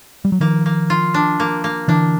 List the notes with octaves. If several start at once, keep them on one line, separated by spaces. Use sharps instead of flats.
G3
F#3
D#3 F3 A#3
A#3
F4
D4
A#3
A#3
D3 E3 D4